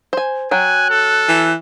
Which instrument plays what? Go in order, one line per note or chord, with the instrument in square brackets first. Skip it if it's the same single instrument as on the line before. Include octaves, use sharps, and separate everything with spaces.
[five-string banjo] C5 G#5
[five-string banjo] F#3 G5 [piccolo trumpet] G#5 [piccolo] F#6
[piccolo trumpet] A4
[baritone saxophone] E3